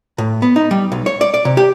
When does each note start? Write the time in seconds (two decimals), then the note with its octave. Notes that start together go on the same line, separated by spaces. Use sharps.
0.18 A2
0.42 B3
0.56 D#4
0.71 G3
0.92 B1
1.06 C#5
1.21 D5
1.34 D5
1.45 C3
1.57 G4